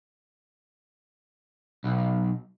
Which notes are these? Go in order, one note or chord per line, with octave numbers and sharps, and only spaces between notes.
B1